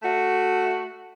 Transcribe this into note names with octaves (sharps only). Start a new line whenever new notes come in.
A3 F#4